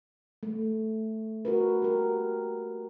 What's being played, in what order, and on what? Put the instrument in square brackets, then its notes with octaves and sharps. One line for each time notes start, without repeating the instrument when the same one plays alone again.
[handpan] A3
F#4 A#4 B4
G4 A#4